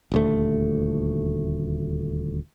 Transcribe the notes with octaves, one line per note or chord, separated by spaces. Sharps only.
D#1 D2 A3